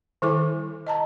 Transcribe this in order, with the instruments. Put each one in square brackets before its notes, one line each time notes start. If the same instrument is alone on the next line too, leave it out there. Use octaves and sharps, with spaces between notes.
[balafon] D#3 G3 E4 A4 G#5 D6
D#5 A5 A#5